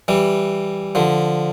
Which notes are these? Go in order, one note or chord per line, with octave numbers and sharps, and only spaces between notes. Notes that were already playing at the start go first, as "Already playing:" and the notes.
E3 G3
D3 F3